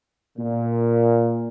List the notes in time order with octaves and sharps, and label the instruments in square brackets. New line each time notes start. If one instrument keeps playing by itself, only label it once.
[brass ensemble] A#2